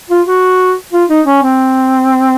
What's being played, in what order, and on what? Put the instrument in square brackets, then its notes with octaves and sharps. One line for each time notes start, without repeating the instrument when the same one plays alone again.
[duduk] F4
F#4
F4
D#4
C#4
C4